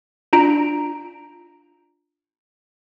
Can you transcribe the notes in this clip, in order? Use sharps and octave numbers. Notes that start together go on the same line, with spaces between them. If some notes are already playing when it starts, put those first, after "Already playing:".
D4 F4 A#5 D7